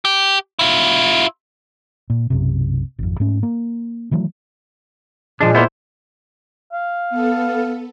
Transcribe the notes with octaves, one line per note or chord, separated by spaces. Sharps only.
G4
E4 F4
A#2
B1 F#2 C3
G#1 F2
G#2 A3 C#4
A#3
D#3 E3 F#3 A3
A#2 F3 G#3 D4
A#3 B3 E4 C5 C6
F5
B3 A4